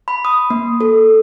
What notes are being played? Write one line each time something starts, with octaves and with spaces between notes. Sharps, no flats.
B5
D#6
A#3
A4